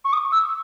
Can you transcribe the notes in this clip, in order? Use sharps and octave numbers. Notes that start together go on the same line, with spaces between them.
C#6
D#6
E6